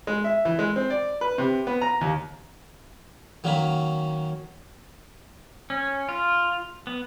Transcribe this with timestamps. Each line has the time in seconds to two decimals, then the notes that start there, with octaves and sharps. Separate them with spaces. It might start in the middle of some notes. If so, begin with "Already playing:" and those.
0.07 G#3
0.24 E5
0.45 E3
0.59 G#3
0.76 C4
0.90 D5
1.21 B4
1.38 C3
1.67 B3
1.81 A#5
2.01 D#2
3.44 D#3 F#3 A#3 C#4 B5
5.70 C#4
6.09 F4
6.87 B3